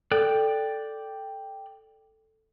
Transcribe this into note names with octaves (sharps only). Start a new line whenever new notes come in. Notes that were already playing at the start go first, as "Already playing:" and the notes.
A4 D5 G5 F#6